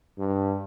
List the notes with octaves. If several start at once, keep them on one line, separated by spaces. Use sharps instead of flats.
G2